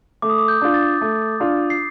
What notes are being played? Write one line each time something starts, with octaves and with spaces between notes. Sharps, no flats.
A3 D6
D#6
D6
G6
D4 F4
A6
A3
D4 F4
C7